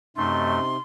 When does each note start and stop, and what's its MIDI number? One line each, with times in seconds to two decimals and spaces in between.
0.17 0.59 42
0.17 0.77 48
0.17 0.59 57
0.17 0.77 63
0.17 0.79 84